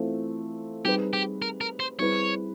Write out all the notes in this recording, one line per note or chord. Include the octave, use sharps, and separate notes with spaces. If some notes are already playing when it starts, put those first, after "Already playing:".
Already playing: E3 A3 C4 F4
G3 C4 D#4 G4 G#4 B4
G4
A#4
A#4
C5
G3 C4 E4 G#4 B4 C#5